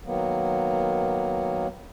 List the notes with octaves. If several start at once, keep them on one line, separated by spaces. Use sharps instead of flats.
D#3 F#3 A#3 B3